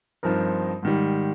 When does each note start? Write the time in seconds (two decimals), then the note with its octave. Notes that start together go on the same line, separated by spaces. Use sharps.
0.23 G2 F3 C4 D#4 A#4
0.83 G#2 D#3 G3